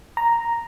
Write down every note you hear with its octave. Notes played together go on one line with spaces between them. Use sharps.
A#5